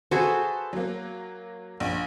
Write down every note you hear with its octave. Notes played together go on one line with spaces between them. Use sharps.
F#4 G#4 A4 B4 C5 E5
F#3 A#3
A#1